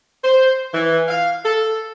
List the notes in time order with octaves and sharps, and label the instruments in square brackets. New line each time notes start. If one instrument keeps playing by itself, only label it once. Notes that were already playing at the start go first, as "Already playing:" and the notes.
[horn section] C5
E3
F5
A4